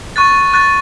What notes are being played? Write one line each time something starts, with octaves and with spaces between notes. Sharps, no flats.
C#6 F#6 A6
C#6 F#6 A6